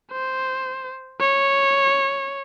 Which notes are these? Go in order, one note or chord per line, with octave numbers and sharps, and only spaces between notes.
C5
C#5